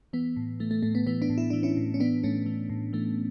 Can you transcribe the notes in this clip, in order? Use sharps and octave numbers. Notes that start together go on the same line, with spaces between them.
E3 B3
A2
E3 A3
A3
A2 A3
B3
E3 B3
B3 D4
A2
E4
E3 D4
C#4 E4
A2
C#4
E3 B3 D4
A2 A3 C#4
E3
A2
E3 A3